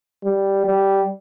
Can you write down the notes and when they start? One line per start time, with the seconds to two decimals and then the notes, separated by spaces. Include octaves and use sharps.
0.24 G3
0.65 G3